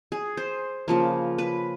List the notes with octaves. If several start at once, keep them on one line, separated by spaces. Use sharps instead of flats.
G#4
C5
C#3 F3 A#3
B4